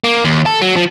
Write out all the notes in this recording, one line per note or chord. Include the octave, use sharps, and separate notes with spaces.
A#3
D#2
A4
F#3
F3